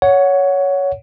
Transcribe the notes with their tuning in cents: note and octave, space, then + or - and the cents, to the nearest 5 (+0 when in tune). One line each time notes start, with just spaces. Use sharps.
C#5 +15 F#5 -5